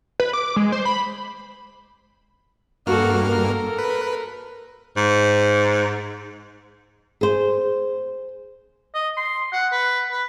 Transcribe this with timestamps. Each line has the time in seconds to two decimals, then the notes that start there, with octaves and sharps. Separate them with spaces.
0.20 B4
0.33 D6
0.56 G#3
0.72 C5
0.85 B5
2.87 G2 A#3 F#4 A4 F6
3.27 A4 A#4
3.78 B4
4.97 G#2
7.21 G#4 C5
8.95 D#5
9.17 C6
9.53 F#5
9.72 B4
10.11 B4